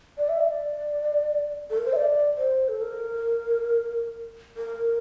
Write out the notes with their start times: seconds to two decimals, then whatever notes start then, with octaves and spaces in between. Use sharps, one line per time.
0.18 D5
0.29 E5
0.41 D5
1.70 A4
1.78 A#4
1.86 C5
1.93 E5
1.96 D5
2.38 C5
2.69 A4
2.82 A#4
4.57 A#4